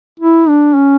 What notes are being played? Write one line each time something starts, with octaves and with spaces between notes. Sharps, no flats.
E4
D4
C#4